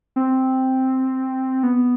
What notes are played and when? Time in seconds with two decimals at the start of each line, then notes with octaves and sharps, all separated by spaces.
0.16 C4
1.63 B3